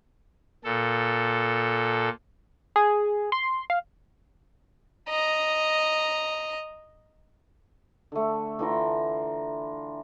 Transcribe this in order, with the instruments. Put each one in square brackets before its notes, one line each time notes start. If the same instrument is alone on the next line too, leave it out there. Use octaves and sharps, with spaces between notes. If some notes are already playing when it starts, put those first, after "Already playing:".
[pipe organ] A#2 A4
[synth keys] G#4
C6
F5
[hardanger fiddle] D#5 A#5
[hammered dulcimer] D3 A3
D3 E3 F4 A#5